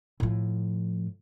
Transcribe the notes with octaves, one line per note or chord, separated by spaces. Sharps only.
A2 F3